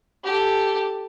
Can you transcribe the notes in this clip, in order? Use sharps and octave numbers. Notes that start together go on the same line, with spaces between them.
G4 A4